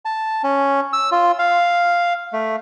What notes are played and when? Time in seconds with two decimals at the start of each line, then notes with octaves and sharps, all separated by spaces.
0.05 A5
0.44 C#4
0.93 E6
1.11 F4
1.39 F5
2.33 A3